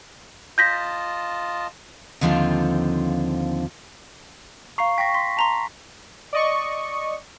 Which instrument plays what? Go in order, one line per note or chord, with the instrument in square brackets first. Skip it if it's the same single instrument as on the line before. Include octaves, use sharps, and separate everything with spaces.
[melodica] F4 D#5 A5 [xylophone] G6 A#6 B6
[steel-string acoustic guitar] D#2 D3 F3 C4 F4 A#5
[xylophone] F5 A#5 [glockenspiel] C#6 C7
[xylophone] G5 C#6 [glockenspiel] A#6 B6
[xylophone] C6 [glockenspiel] B6
[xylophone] A5 A#5 C6
[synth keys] D5 D#5 C#6